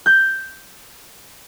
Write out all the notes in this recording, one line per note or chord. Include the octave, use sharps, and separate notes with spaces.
G6